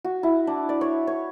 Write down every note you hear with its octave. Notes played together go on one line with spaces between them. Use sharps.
F#4
E4
D4
D5
C#5
C#5